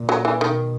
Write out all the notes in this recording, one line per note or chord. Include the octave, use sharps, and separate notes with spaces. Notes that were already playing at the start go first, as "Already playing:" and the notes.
Already playing: A#2
F#3
E3
B2 D#3